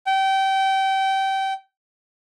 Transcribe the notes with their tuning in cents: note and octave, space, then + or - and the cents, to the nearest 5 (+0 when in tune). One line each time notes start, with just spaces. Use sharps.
G5 -25